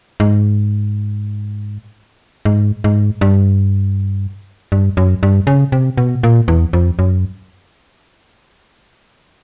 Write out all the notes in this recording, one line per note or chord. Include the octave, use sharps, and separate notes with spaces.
G#2
G#2
G#2
G2
G2
F#2
G2
C#3
C3
B2
A#2
E2
F2
F#2